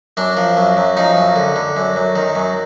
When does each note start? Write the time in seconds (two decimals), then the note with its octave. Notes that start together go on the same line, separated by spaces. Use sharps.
0.17 F#2 D4
0.37 F3
0.57 F#2
0.77 F#2
0.97 F3 D#4
1.17 F#2
1.36 D3
1.56 D3
1.77 F#2
1.96 F#2
2.16 D#3
2.35 F#2